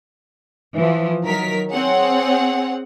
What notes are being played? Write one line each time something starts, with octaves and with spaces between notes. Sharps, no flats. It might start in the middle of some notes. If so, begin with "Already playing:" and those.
E3 F3
D#3 F#3 A#4 B6
C4 G#4 C#5 F#5